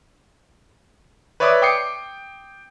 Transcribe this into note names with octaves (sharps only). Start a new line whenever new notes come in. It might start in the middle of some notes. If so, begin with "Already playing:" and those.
B4 C#5 D5 E5 D6 D#6
G5 D6 D#6 C7 C#7